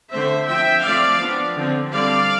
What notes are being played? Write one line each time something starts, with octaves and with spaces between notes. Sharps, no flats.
D3 A3 C4 C5 E5
F3 C4 E5 G5
F3 A3 C4 D5 F5
F3 B3 D4
D3 F3 C4
D3 G3 C4 D5 F5